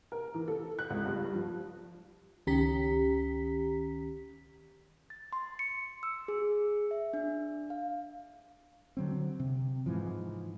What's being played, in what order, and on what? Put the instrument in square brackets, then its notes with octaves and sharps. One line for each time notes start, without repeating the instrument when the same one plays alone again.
[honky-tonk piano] A#4
E3
A4
F#6
C#2
G2
F3
[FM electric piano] C#2 D#3 C#4 G4 A#5 B6
[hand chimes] A6
C6
C#7
E6
G#4
E5
D4
F5
[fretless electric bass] D3 F#3 C4
C3
G#2 E3 F3